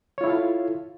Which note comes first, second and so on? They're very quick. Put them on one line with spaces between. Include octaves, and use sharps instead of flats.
C#5 F4 E4 A4 F5